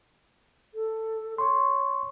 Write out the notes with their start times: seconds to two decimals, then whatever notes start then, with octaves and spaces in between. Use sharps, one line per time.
0.74 A4
1.38 C#5 C6 C#6